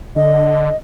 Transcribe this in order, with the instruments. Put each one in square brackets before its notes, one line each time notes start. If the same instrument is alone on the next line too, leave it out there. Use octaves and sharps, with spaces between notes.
[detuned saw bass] D3 [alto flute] D#5